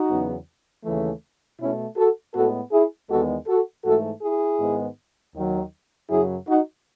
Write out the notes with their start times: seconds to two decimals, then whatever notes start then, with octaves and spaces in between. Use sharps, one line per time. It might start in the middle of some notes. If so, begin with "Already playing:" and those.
Already playing: D#4 F#4
0.09 E2 C#3 F#3 B3
0.84 D#2 C#3 E3 A3
1.59 B2 A3 C#4 E4
1.96 F#4 A4
2.34 A2 G#3 B3 F#4 A4
2.72 E4 G#4
3.09 E2 D#3 G#3 B3 F#4 A4
3.47 F#4 A4
3.84 G#2 E3 A3 F#4 A4
4.21 E4 G#4
4.60 G#2 D#3 G#3 B3
5.34 D#2 D#3 F#3
6.10 F#2 C#3 F#3 E4 G#4
6.47 D#4 F#4